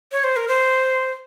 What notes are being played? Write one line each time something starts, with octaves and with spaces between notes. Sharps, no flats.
C#5
C5
A#4
C5